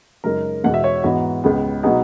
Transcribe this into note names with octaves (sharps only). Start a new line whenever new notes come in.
F#2 C#3 G#3 D#4 A#4
E2 B2 G#3 F#5
E5
C#5
G#2 E3 B3 D#4 F#4
C#2 C#3 G#3 B3
B2 F#3 B3 D#4 G#4